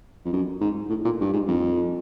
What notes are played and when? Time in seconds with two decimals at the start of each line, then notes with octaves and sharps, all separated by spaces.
0.25 F2
0.33 F#2
0.61 G#2
0.89 A2
1.04 A#2
1.21 G2
1.33 G#2
1.47 F2